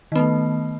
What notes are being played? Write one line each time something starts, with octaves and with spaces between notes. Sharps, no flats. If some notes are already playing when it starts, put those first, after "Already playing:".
D#3 A3 B3